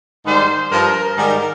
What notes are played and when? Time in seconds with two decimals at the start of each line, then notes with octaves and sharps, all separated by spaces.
0.26 G#2 D#3 G3 C5
0.72 G2 F3 A#4
1.17 G#2 D#3 G3 A#4